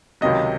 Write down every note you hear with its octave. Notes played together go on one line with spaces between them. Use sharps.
C#2 C3 D#3 F#3 D#5